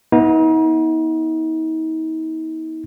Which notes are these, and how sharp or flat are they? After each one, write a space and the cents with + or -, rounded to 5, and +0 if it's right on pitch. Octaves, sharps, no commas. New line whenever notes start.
B3 -25 D#4 +40